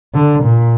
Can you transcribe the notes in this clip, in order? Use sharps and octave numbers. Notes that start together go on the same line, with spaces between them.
D3
A#2